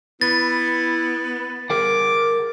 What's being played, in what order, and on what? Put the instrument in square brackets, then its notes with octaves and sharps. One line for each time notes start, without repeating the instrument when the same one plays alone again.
[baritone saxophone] B3 [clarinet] E4 [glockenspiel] A6
[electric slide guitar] G#4 A#4 F#5 [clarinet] D6